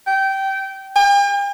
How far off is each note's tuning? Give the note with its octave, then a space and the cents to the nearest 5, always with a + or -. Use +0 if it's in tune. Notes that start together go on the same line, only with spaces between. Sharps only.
G5 -20
G5 +45